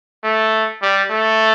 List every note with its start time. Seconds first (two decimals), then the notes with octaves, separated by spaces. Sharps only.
0.24 A3
0.82 G3
1.11 A3